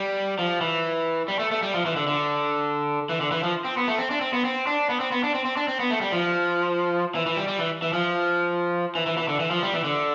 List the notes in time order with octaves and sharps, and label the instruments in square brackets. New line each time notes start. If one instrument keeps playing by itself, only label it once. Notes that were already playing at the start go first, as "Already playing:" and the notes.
Already playing: [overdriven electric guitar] G3
F3
E3
G3
A3
A3
G3
F3
E3
D3
D3
E3
D3
E3
F3
C4
B3
A3
C4
D4
C4
B3
C4
D4
B3
C4
B3
D4
C4
C4
D4
C4
B3
A3
G3
F3
E3
E3
G3
G3
E3
E3
F3
E3
E3
E3
D3
E3
F3
G3
E3
D3